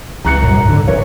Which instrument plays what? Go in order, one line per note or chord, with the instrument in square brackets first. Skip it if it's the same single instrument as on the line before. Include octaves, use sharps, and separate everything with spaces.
[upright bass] C#2 [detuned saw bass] E3 [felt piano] A#5 F#6 C#7
[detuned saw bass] F#2 [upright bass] A#2 G3
[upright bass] G#2
[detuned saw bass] D3
[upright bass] G1 [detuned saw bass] E3 [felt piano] A#4 C#5